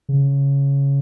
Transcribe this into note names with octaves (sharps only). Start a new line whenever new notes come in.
C#3